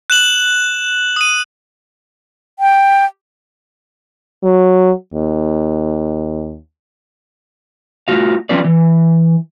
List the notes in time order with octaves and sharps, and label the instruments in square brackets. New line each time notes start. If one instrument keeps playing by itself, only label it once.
[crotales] F#6 E7 F#7
D#6 D#7
[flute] G5
[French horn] F#3
D#2
[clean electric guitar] A2 A#3 F4 F#4 F5
F3 C4 C#4 F4 B4 D5
E3